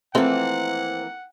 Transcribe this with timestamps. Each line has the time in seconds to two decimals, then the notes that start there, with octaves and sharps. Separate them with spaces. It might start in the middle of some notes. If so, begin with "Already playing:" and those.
0.15 E3 F3 A3 A#3 C4 E4 F#5